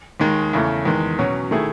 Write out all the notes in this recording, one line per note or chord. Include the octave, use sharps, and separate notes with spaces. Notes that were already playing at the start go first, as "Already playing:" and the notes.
D#2 D#3 G#3
E2 C#3 E3 A3
E2 D#3 G#3
B2 F#3 C#4
D#3 A3 E4 G#4